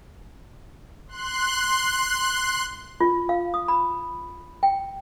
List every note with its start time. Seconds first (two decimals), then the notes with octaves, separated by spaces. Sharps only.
1.08 C6 F#6
3.01 F4
3.29 F5
3.54 D#6
3.68 B5
4.63 G5